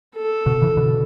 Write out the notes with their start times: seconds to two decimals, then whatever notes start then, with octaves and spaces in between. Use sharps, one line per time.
0.16 A4
0.46 B2 D3
0.62 C#3 E3
0.77 B2 D3